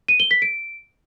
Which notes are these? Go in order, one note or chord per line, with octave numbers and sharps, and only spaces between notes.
D#7
G7
B6
D7